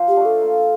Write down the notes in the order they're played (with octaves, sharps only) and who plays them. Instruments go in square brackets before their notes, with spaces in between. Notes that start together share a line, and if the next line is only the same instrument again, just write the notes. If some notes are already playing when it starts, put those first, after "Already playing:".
Already playing: [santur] F3 F4 C5 F5
[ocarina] G4
[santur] A3 D4
[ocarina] A4
[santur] A#3